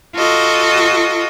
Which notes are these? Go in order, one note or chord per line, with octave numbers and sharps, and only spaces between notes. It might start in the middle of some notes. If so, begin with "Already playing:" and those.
F4 F#4 A4 D#5